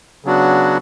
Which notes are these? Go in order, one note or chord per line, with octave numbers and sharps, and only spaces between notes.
C#3 F#3 B3 D4 F#4